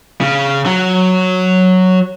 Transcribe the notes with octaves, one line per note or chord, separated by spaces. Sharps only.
C#3
F#3